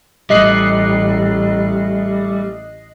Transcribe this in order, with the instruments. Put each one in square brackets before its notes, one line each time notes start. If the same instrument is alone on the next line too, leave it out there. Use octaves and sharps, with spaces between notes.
[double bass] A1 [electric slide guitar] G3 A3 [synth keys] D#5 F#6 C7